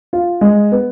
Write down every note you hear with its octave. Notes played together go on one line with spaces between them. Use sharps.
F4
G#3
B3